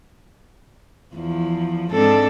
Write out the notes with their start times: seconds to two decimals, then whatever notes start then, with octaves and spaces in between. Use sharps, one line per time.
1.14 E2 F3
1.92 G#2 C4 D4 A4